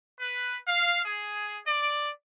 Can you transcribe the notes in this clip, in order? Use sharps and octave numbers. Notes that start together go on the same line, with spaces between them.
B4
F5
G#4
D5